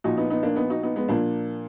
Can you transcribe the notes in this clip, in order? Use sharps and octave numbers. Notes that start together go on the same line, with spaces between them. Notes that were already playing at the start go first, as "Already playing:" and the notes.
A#2 F3 D#4 F#4
B3 D#4
B3 D#4
A#3 D4
B3 D#4
D#4 F#4
B3 D#4
G#3 B3
A#2 F3 A#3 D4